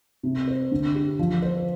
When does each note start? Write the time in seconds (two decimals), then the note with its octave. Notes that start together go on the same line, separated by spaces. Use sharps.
0.23 C3
0.48 C5
0.71 D3
0.95 G4
1.19 F3
1.42 C5